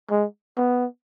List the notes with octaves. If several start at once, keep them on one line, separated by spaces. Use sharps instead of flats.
G#3
B3